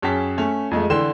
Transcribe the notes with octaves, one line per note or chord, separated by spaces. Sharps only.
F#2 C#4 G#4 G5 A5 B6
A3 C#4
F2 G#3 A3
D3 E3 G5 C6 E7